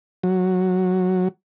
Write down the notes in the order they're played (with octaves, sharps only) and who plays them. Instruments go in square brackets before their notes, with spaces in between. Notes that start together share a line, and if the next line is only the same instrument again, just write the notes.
[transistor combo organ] F#3